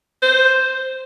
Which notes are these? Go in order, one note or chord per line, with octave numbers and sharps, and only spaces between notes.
C5